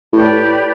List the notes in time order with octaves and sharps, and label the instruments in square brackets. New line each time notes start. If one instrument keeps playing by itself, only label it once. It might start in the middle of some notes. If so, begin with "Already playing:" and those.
[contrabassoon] A2 [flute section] G4 B4 D5